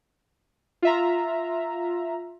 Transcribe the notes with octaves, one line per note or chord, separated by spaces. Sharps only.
F4 E5 A#5